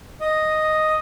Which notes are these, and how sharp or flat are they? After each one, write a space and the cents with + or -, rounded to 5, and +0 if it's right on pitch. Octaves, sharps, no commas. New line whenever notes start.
D#5 +0